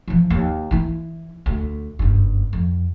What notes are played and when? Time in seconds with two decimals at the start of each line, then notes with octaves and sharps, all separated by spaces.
0.08 E3 F3
0.30 D#2
0.71 E3 E4
1.46 D2
1.99 F#1 G2
2.53 F2